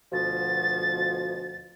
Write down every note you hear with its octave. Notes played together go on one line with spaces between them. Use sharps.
D2 B2 F3 A6